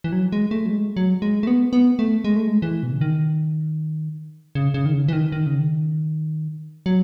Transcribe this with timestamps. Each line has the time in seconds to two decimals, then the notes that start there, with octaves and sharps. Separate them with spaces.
0.04 E3
0.12 F#3
0.32 G#3
0.51 A3
0.66 F#3
0.70 G#3
0.97 F#3
1.22 G#3
1.43 A3
1.47 B3
1.73 B3
1.99 A3
2.24 G#3
2.36 A3
2.48 G#3
2.62 E3
2.83 B2
2.92 C#3
3.01 D#3
4.55 C#3
4.74 C#3
4.86 D#3
4.94 C#3
5.08 E3
5.13 D#3
5.32 D#3
5.46 C#3
5.60 D#3
6.86 F#3